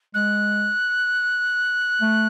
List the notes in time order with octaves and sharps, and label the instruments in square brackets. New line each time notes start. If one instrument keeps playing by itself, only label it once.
[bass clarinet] G#3 [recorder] F#6
[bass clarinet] A3